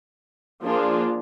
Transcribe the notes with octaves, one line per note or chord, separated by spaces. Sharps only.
F3 A#3 D4 F4 G#4